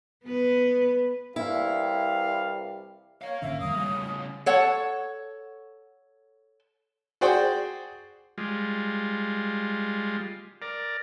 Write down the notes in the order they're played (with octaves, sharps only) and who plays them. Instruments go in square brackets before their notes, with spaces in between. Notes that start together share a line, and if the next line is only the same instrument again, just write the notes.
[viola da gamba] B3 B4
[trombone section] C2 E3 G3 [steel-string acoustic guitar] E4 [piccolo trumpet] F5
[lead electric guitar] A#4 F5 [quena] C#5
[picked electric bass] G#1 D3 C#4 [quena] E5
[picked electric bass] E1 D#3 G3 [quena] D#6
[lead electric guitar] A2 C#3 [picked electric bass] G3
[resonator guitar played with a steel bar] A4 C#5 F#5
[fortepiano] F#4 G#4 C5 D5 F#5 G5
[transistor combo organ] G3 G#3 F4
A#4 D5